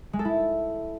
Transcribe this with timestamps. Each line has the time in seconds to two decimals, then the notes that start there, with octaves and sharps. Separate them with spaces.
0.13 G#3
0.19 A4
0.25 E4